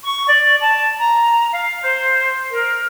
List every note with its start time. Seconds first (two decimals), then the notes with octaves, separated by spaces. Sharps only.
0.03 C#6
0.28 D5
0.59 A5
0.97 A#5
1.52 F5
1.81 C5
2.52 A#4